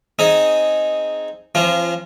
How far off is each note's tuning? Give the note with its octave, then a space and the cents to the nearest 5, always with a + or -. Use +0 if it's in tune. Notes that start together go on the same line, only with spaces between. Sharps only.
C4 +0 D#4 +0 G#4 +5
F3 -30 C4 +40 F4 -20